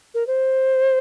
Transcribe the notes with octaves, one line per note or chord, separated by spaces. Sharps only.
A#4
C5